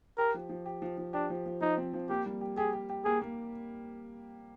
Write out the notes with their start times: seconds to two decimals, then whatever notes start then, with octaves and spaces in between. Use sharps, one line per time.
0.18 G4 A#4
0.34 F3
0.49 F3
0.66 G4
0.82 F3
0.98 F3
1.13 D4 G4
1.30 F3
1.46 F3
1.61 F3 D#4
1.77 C4
1.94 F3
2.09 A#3 G4
2.26 G3
2.41 G4
2.57 G4 G#4
2.73 G4
2.90 G4
3.05 A#3 G#4
3.22 A#3